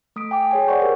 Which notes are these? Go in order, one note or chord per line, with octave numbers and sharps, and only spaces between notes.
A3 D#6 B6 D7
G5 G#5 D6
G#4 C#5 G#5
C5 D5 F#5 C6 C#6 G6
G4 G#4 A#4 C5